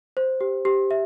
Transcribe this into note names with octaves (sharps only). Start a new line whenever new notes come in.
C5
G4
G4
E5